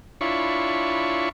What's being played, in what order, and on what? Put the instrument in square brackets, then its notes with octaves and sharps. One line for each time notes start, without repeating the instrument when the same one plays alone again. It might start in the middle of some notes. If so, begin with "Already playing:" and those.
[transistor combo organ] D4 E4 F4 C#5 B5 C#6